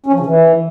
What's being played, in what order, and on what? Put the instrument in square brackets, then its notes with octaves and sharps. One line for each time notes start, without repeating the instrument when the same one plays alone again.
[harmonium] C#4
F3
C#3
E3